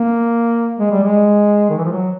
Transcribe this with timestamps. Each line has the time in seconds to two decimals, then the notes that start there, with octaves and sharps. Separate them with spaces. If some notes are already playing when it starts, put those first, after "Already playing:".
Already playing: A#3
0.79 G#3
0.91 G3
1.04 G#3
1.70 D#3
1.78 E3
1.85 F3
1.92 F#3